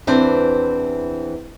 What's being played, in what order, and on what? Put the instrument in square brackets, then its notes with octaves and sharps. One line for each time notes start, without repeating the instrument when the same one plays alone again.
[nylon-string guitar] E2 E3 C4 D4 C5